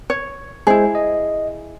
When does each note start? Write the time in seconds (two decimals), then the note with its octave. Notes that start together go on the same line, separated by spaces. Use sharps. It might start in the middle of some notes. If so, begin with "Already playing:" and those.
0.10 C#5
0.67 G#3 E4 G#4 C5
0.95 D#5